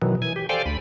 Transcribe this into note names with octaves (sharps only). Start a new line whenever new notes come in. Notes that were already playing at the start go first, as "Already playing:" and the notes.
B2 D#3 E3 F#3
E3 G#5
G4
A4 C5 D5 F5 G5 G#5
D2 B5